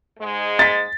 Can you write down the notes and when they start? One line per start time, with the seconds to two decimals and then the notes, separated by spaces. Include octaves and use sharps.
0.20 G#2 G#3
0.59 A6 B6